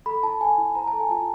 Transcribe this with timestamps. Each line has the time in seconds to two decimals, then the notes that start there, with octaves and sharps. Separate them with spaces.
0.06 A4 B5
0.23 E4 A5
0.41 A4 G#5
0.58 E4
0.75 C5 A#5
0.87 A5
0.93 A4
1.00 G#5
1.10 F4 A5